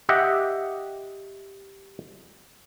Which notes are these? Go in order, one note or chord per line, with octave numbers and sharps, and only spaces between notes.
G4 D#5 E5 F#5